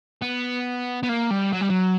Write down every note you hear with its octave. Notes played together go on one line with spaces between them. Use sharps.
B3
B3
A#3
G3
F#3
G3
F#3